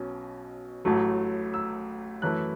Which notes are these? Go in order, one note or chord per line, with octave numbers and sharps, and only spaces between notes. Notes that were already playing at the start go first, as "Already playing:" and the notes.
Already playing: B1 B2 C#4
A1 A2 F#3 A3
E6
F#2 E3 A3 E4 F#6